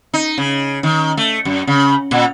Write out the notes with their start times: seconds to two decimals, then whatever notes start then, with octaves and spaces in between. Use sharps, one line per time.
0.14 D#4
0.38 C#3
0.83 D#3
1.17 A3
1.45 F#2
1.67 C#3
2.11 A#2